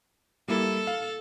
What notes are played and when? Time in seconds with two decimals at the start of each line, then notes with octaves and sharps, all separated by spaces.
0.48 G3 A#3 E4 A4
0.87 F5